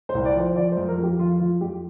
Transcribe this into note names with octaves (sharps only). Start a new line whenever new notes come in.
C5
C2
D5
F3 C5
F3 D5
C5
F2
A#4
F2
G4
F3 F4
F3 F4
F2 G4